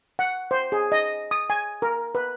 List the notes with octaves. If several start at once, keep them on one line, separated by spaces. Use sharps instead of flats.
F#5
C5
G#4
D#5
D#6
G#5
A#4
B4